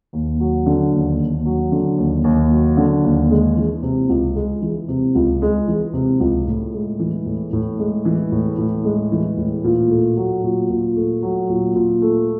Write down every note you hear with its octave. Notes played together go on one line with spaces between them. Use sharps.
D#2
F#3
D3
D#2
D#2
F#3
D3
D#2
D#2
F#3
D3
D#2
G#3
E3
C3
C#2
G#3
E3
C3
C#2
G#3
E3
C3
C#2
A2
G#3
E3
A2
A2
G#3
E3
A2
A2
G#3
E3
A2
A#2
A3
F#3
A#2
A#2
A3
F#3
A#2
A#2
A3